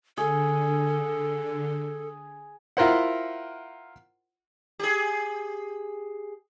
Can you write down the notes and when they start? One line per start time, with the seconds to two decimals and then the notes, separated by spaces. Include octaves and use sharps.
0.17 D3 G#4 A4
2.77 E4 F4 A#4 C5 F#5
4.79 G4 G#4